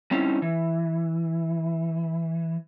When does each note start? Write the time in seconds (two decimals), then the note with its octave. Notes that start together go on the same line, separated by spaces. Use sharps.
0.11 G3 C4 C#4 D#4 E4
0.42 E3